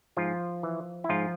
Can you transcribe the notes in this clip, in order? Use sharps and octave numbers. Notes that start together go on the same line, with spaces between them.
G#2 F3 F4
E3
E4
G#2 F3 F4